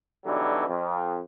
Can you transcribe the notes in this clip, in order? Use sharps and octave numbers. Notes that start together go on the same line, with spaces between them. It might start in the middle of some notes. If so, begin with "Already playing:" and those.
B1 B2 D3 E3 F#3 G3
F2